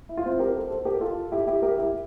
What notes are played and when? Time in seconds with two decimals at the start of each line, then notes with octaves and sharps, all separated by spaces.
0.09 E4
0.17 F4
0.26 C4 E4
0.39 G4 A#4
0.55 A4 C5
0.70 A4 C5
0.85 G4 A#4
1.01 F4 A4
1.32 E4 G4
1.47 E4 G4
1.62 G4 A#4
1.78 E4 G4